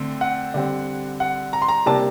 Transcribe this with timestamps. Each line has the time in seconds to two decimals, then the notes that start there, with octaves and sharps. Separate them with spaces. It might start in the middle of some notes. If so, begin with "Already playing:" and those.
Already playing: D3 A3 C4
0.21 F#5
0.54 D3 G3 C4
1.20 F#5
1.53 A#5
1.62 C6
1.69 A#5
1.86 C3 G3 A#3 D4 A5